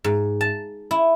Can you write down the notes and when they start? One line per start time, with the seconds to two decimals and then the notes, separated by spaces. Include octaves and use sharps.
0.04 G#2
0.41 A5
0.91 E4